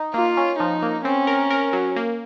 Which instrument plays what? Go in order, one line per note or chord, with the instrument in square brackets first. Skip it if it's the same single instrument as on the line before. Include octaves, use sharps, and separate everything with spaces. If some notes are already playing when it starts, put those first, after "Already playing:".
Already playing: [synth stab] D#4
[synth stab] A#3 [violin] F4
[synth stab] C#4
[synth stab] F3 [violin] D#4
[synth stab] A#3
[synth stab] C4 [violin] C#4
[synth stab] A#4
A#4
F#3
A#3